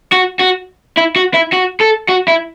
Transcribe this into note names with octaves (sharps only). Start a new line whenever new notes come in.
F#4
F#4
E4
F#4
E4
F#4
A4
F#4
E4